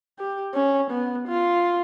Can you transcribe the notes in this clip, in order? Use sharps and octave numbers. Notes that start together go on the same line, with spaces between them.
G4
C#4
B3
F4